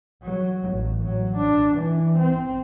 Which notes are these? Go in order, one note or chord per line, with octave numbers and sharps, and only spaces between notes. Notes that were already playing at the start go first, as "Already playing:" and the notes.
F#3
A1
F#3
D4
E3
C4